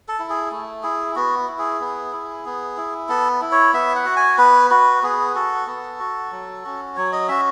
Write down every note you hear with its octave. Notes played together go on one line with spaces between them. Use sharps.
A4
E4
G#4
A3
E4 G#4
B3 F#4
E4
G#4
B3
E4
B3
E4
B3 A4
E4
C#5
B3 E5
F#5
F#4
G#5
B3 B4
F#4 B4
B3 G#4
F#4 A4
B3
F#4
F#3
C#4 F#4
F#3 C#5
D#5
C#4 F#4 E5